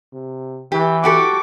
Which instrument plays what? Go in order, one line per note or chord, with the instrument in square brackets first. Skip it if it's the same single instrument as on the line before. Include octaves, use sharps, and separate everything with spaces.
[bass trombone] C3
[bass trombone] E3 [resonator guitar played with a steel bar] G4
[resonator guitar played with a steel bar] F#4 G4 A4 [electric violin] C#6 D6